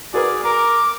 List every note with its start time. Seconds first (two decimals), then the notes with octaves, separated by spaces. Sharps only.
0.14 F#4 G#4 A#4 B4 D5
0.44 A#4 A#5 D6